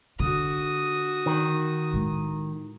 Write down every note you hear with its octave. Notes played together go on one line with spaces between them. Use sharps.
D3 F#4 D#6
D#3
A2 G#3